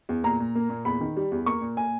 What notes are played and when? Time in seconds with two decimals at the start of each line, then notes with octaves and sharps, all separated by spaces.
0.09 E2
0.24 A#2 A#5
0.40 A#2
0.55 A#3
0.69 A#2
0.85 E2 B5
1.01 D#3
1.17 G3
1.32 E2
1.46 A#3 C#6
1.61 A#2
1.77 A#2 G#5